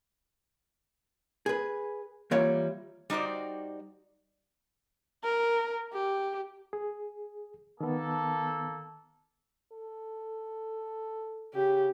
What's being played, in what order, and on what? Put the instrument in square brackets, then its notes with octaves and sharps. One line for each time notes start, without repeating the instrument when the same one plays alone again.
[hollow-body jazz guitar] G#4 B4
E3 G3 A#3 F4 C#5 E5
[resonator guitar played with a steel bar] G3 D#4 F#4 C5 D5
[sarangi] A#4
G4
[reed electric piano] G#4
[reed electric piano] D#3 B3 [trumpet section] A#3 A4
[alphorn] A4
[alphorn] C#3 [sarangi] G4